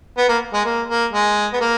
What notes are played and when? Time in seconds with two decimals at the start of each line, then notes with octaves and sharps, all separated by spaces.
0.18 B3
0.29 A#3
0.54 G#3
0.65 A#3
0.89 A#3
1.13 G#3
1.53 B3
1.61 A#3